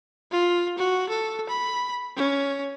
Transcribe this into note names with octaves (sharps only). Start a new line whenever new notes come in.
F4
F#4
A4
B5
C#4